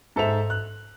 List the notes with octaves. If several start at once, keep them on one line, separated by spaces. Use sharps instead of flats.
G#2 A4 C5 E5 F7
F#6